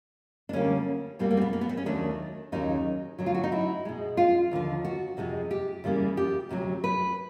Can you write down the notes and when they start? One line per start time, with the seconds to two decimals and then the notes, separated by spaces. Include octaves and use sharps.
0.49 D4
0.53 D2 D3 G3 A#3 C#4
1.19 B2 G3 A#3 C4
1.31 A#3
1.37 C4
1.42 B3
1.53 A#3
1.61 B3
1.69 C4
1.77 C#4
1.86 D#2 D#3 F#3 A3 D4
2.52 D#2 C#3 F#3 D#4
3.18 D2 D3 F#3
3.26 F4
3.35 F#4
3.44 D#4
3.52 E4
3.85 B2 G#3
4.17 F4
4.52 D#2 D3 F3
4.85 F#4
5.17 F2 C3 F3 G#3
5.51 G4
5.84 E2 C#3 E3 G3 A#3
6.17 G4
6.49 D2 C3 D#3 F#3
6.84 B4